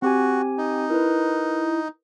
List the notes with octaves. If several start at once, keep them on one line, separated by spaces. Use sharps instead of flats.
C4 F#4 G4 G#5
D#4
E4 A#4 B4